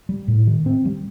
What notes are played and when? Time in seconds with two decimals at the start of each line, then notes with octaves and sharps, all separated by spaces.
0.09 G3
0.28 A2
0.47 D#3
0.66 C4
0.85 G3